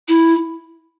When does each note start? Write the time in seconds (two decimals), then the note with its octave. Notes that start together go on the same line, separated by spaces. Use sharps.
0.09 E4